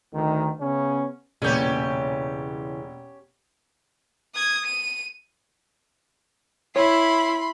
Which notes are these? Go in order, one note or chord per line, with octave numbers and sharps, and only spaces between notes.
D2 D#3
C#3 B3 C#4
E1 A#2 C#3 E3 C#4 G4 G6
D#6 G#6
D#7
E4 C#5 B5 C6